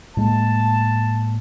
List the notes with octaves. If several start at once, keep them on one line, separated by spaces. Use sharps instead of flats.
A2 G#3 A#3 A5